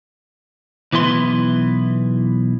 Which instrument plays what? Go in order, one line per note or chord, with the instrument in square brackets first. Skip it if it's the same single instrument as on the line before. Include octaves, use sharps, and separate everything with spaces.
[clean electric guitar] B1 E3 B3 E4 C6